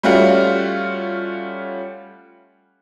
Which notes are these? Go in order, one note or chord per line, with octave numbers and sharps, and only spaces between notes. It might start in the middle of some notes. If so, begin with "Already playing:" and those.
G3 A3 C#4 F4 F#4